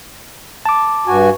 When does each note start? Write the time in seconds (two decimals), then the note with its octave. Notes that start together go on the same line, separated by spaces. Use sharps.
0.66 A5 D6
1.08 G2 F#4 G#5